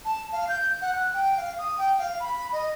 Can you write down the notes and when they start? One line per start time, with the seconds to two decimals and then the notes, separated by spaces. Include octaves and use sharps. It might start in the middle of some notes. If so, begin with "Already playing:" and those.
0.04 A5
0.32 F5
0.48 G6
0.81 F#5
0.95 F#6
1.13 G5
1.36 F5
1.58 D#6
1.78 G5
1.98 F5
2.20 B5
2.52 D#5